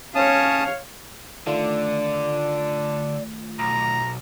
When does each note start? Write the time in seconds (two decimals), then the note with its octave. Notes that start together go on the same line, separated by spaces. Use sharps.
0.15 C#4 C#5 F5 A5 D#6
1.47 D3 D#3 A3 F4 D5
3.59 B1 A#5